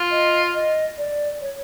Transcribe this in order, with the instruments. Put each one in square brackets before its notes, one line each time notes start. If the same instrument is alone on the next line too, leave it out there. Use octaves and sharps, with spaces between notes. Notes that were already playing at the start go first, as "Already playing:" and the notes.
Already playing: [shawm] F4
[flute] D#5
D#5
D5
C#5